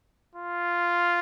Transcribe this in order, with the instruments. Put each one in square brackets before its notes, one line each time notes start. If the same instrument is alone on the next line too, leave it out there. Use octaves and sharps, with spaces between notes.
[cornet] F4